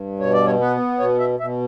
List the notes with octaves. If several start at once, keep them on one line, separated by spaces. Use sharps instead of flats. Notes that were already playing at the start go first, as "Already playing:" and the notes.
Already playing: G2
B2 C#5
D5
C#5
B3 B4
B2 C#5
E5
B2 E5